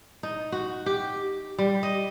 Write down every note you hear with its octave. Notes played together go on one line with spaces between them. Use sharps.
D#4
F#4
G4
G3
D#5